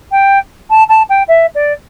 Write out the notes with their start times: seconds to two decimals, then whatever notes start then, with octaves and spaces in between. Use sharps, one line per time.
0.12 G5
0.70 A5
0.89 A5
1.09 G5
1.28 E5
1.55 D5